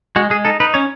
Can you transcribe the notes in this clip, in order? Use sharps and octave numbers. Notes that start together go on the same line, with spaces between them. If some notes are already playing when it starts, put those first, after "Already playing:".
G#3 F#4
G#3 G#4
D#4 A4
D#4 B4
C#4 C#5